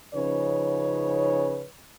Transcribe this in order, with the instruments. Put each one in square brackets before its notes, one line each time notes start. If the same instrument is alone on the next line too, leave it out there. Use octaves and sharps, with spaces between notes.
[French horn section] C#3 F3 C#4 D#4 B4 C#5